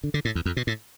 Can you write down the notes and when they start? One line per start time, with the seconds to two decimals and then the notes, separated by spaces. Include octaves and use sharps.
0.04 D3
0.14 D3
0.25 A2
0.35 E2
0.46 F2
0.57 B2
0.67 A2